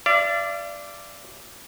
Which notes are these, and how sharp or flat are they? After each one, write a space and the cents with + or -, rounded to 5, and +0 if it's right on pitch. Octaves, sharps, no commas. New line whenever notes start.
D5 -5 F5 -45